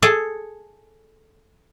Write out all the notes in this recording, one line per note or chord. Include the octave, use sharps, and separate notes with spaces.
G#4 A4